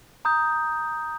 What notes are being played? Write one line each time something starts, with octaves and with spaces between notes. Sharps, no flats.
A#5 D#6 G6